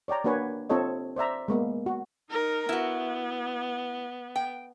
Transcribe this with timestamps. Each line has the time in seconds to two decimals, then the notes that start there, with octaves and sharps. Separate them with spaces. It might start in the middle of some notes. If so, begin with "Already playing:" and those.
0.08 C#5 D5 G5 A#5
0.24 A#3 D4 F#4 B4 C#5 G#5
0.69 C4 F4 A4 C#5 D#5
1.16 C5 D5 E5 A#5
1.48 G#3 A#3 B3
1.86 F#4
2.30 D#4 A#4
2.69 B3 E4 F#4
4.36 G5